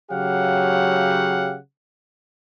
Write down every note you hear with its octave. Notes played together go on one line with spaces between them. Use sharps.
C#3 F#3 G4 F5 F#5